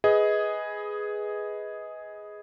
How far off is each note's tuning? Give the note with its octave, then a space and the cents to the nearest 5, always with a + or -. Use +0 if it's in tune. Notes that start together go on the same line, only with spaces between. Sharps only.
G#4 +0 B4 +0 D#5 +20